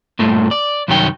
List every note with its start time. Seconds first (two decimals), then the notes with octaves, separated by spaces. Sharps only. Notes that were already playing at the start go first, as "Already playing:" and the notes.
0.19 G2 A#2 A3
0.51 D5
0.88 C2 F#2 D#3 F#3 C#5 G5